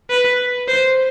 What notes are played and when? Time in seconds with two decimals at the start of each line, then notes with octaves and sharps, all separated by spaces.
0.10 B4
0.68 C5